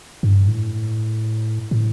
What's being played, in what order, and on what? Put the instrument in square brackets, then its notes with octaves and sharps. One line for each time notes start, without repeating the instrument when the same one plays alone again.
[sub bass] G2
A2
A2